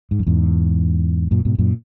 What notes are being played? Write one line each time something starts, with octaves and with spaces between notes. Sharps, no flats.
G#2
F#2
E2 G#2
F#2 A#2
G#2 B2
F#2 A#2